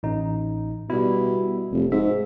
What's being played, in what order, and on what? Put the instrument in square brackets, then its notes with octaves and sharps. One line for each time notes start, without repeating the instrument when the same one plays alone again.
[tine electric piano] A1 D#4
[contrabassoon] B2 [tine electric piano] G3 E4
[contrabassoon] F1
[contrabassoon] G#2 [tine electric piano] E5